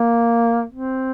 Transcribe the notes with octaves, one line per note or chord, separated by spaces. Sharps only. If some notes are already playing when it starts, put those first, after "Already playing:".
Already playing: A#3
C4